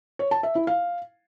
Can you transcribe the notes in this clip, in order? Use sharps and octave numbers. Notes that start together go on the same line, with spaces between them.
C#5
A5
E5
E4
F5